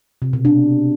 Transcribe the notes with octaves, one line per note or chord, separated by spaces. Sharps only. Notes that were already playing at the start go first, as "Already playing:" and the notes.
C3
B2
D4